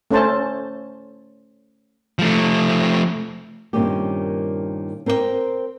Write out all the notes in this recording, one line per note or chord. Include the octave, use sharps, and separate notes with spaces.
A3 C#4 A4 C5 A5
F3 A3
G2 A#2 D#3 C4 C#4 G4
C4 A#4 C5 D5 G5